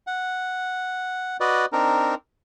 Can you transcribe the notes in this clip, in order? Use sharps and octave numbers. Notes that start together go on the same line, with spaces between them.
F#5
F#4 B4 D5 D#5
C4 D4 D#4 A#4